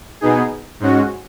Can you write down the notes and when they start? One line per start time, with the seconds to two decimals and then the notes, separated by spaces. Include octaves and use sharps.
0.21 B2 B3 D#4 G#4
0.80 G#2 G#3 C#4 F#4